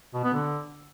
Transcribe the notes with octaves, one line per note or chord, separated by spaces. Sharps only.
B2
B3
D3